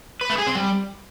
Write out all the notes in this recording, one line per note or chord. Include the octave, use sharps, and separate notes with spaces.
B4
A3
G#4
C4
G3